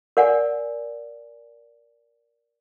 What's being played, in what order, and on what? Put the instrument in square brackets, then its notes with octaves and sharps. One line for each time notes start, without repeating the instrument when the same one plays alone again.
[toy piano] A#4 D5 F#5 G#5